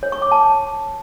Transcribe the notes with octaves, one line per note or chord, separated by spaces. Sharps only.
C#5
C#6
D6
A5